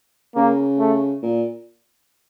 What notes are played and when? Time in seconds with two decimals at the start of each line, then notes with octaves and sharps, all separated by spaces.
0.36 C#3 A#3
0.79 A3
1.22 A#2